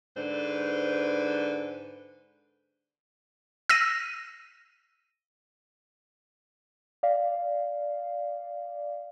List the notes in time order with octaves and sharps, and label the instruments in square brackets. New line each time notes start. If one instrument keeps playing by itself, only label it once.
[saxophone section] G#2 D3 B4 C5
[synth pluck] E6 A#6 D#7
[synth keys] D5 F5